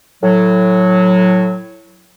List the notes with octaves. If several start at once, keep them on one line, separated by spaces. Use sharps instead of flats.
A2 F#3